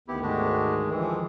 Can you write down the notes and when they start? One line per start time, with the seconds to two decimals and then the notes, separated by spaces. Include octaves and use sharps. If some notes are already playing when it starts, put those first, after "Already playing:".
0.08 D2 D#3 B3 E4 G4
0.23 G#2 G#3 D4 F#4 G4
0.91 E3 F3 G#4